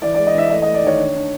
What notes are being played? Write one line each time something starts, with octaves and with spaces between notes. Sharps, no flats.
E3 D5
D5
G#3
D#5
E3 E5
A3 D#5
D#5
A3
D5
D#3 C#5
D4
D4